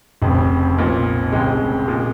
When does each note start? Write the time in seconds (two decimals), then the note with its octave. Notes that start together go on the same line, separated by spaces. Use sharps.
0.22 F1 F2 C#3
0.76 B1 A#2 F3
1.32 F1 F2 C#3 G#3
1.88 A#2 G#3